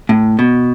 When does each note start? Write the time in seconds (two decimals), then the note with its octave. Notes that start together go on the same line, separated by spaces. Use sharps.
0.09 A2
0.39 B2